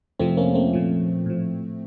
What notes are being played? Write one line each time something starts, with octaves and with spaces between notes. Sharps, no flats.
F2 C3 F3 A3 C4
A#3 C#4
A3 C4
A#2 F3
A2 F3